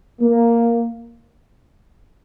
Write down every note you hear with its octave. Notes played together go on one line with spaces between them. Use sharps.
A#3